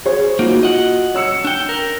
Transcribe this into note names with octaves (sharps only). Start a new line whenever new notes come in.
G#4 C5 C#5
A#3 D#4 F4 F#4
D#5 F#5
C#5 E6 C#7
D4 G5
A#4